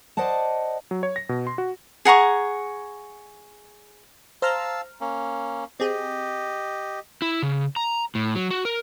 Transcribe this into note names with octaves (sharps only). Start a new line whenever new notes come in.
C5 D5 D#5 F#5 A5
F#3
C#5
A#6
B2
C6
F#4
G#4 F#5 A#5 C#6
C5 F5 A5 A#5 E6 F6
A#3 C#4
C4 G4 G#4 D#5
E4
C#3
A#5
A2
F#3
F#4
A#4